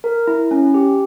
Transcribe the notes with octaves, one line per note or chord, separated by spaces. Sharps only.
A#4
E4
C#4
G4